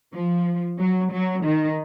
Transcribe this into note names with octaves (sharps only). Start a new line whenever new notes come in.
F3
F#3
F#3
D#3